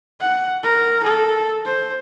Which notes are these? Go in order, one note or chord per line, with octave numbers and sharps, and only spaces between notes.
F#5
A#4
A4
C5